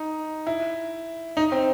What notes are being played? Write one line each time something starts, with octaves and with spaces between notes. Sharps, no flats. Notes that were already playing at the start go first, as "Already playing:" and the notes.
Already playing: D#4
E4
D#4
C4